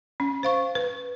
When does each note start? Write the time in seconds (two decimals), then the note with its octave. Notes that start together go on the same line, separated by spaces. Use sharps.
0.20 C#4
0.43 C5 F5 C#6
0.75 B4